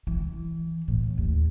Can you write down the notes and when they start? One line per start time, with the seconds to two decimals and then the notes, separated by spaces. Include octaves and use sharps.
0.07 E3
0.88 A2
1.18 D#2